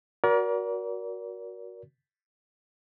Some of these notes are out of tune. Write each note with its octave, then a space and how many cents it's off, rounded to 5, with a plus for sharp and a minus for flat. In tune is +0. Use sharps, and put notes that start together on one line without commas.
F#4 +0 A#4 +30 D5 -35